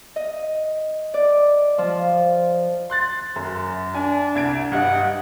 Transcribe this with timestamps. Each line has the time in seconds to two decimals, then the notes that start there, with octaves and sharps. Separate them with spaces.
0.16 D#5
1.14 D5
1.78 F3
2.90 C6 F#6 A6
3.36 F#2
3.94 D4 G#5
4.35 C2 G#6 D7
4.72 G2 G4 D#5 F#5